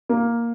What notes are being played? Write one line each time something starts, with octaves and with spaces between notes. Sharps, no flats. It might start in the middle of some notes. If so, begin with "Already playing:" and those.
A#3